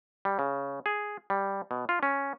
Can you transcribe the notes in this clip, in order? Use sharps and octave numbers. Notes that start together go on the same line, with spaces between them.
G3
C#3
G#4
G3
B2
F4
C#4